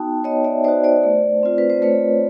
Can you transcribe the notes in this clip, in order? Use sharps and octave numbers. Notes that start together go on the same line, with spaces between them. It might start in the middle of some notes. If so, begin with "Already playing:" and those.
Already playing: B3 D#4 F#4 G5 A5
B3 C#5 D#5
D5 E5
D#4 F#4 C5 D5
C5 D5
A3
C4 F4
B4
C5
A3 B4 C#5